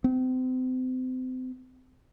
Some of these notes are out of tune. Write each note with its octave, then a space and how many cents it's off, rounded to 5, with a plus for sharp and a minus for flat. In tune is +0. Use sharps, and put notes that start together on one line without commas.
C4 -35